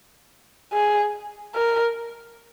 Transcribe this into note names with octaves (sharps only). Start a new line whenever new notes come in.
G#4
A#4